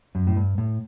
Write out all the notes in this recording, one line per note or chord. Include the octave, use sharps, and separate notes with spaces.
F#2
A2
G2
A2